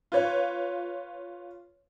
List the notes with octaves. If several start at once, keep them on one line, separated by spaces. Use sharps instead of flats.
F4 B4 C#5